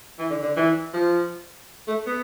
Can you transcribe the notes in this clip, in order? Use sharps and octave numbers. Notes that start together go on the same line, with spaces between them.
E3
D3
D3
E3
F3
A3
B3